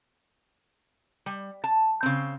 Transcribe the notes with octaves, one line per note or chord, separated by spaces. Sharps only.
G3
A5
C#3 C4